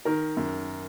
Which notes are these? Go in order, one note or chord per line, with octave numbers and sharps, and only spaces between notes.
D#3 A#4
F#2